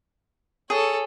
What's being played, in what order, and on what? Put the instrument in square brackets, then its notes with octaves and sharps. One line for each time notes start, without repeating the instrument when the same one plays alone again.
[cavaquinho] G#4 [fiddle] A4 C#5